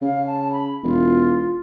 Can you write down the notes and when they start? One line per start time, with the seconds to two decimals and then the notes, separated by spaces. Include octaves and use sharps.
0.02 C#3 F5
0.27 A5
0.52 B5
0.83 E1 F4